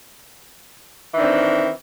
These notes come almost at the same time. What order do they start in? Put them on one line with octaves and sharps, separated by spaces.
E3 D#3 D4 C4